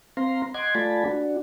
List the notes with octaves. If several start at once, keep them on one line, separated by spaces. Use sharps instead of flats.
C4 F5 A#5 C6
D#5 F#5 C6 D6 G#6
A3 F4 D5 G#5 A5 B5
D4 F#4